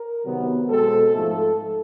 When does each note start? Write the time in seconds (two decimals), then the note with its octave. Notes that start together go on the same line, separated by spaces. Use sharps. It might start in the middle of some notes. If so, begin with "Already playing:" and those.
Already playing: A#4
0.24 C3 D#3 F#3 B3
0.68 B2 G#3 C4 A4
1.13 G#2 F3 A3 A4